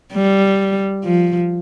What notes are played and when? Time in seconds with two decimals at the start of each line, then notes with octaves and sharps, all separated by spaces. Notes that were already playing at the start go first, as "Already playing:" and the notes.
0.13 G3
1.04 F3